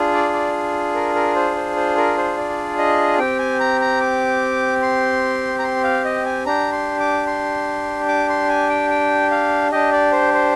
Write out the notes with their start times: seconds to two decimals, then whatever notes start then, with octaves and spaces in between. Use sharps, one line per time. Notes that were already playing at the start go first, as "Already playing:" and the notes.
Already playing: D4 F4 G#4
0.14 D5
0.33 D5
0.95 A#4
1.15 A#4
1.36 C5
1.56 C5
1.76 C5
1.97 A#4
2.18 C5
2.38 D5
2.78 D#5
3.19 C4 G4 G5
3.39 G#5
3.60 A#5
3.81 A#5
4.01 D6
4.82 C6
5.59 A#5
5.64 C6
5.84 F5
6.05 D#5
6.25 G#5
6.46 D4 G4 A#5
6.72 C6
7.00 D6
7.27 C6
8.09 D6
8.29 C6
8.49 G#5
8.70 G5
8.90 G5
9.31 F5
9.72 D4 G4 D#5
9.93 D5
10.12 C5
10.34 C5